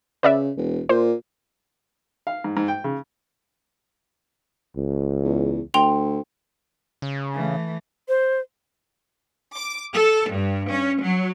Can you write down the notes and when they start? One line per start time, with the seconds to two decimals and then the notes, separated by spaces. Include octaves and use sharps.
0.23 C#3 B4 D5 E5
0.57 E1
0.89 A#2 C5
2.27 F5
2.44 G#2
2.57 G#2
2.68 G5
2.84 C#3
4.76 C#2
5.24 E2
5.74 D2 G5 C6 F7
7.02 C#3
7.34 E3 A3
8.08 C5
9.55 D6
9.92 A4
10.29 G2
10.68 C#4
11.01 F#3